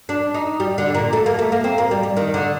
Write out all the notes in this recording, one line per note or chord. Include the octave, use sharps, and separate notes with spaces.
D4
D#4
G3
D3
A#2
A3
A#3
A3
A#3
C4
A#3
G3
G3
D#3
D3